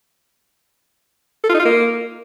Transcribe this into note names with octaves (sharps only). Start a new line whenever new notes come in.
A4
F4
D#4
F4
A#3